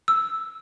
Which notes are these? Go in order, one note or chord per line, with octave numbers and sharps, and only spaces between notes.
E6